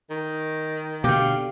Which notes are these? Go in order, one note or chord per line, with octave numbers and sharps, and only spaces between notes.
D#3
B2 D3 G4 F5